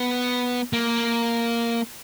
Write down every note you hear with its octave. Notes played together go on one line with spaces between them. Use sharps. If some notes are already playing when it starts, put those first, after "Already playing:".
Already playing: B3
A#3